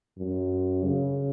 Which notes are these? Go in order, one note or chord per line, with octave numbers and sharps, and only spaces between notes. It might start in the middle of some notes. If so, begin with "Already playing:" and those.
F#2
C#3